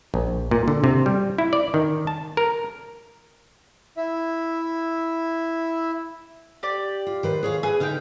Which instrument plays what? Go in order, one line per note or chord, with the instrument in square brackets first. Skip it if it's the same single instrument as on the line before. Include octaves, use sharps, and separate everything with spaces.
[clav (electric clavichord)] A#1
A#2
D3
C3
G3
E4
D5
D#3
A5
A#4
[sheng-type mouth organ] E4 E5
[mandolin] G4 D5
[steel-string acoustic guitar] F4
D#3 B4 C5
G#4 C#5 F5
[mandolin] G#4 [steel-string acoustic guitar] B4
[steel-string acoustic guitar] D3 D#4 G4 [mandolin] F5 G5